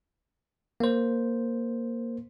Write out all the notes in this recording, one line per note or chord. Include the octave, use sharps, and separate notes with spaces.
A#3 C5